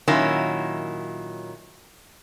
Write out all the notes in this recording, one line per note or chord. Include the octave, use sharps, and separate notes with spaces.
A#2 D#3 F#3 C#4 E4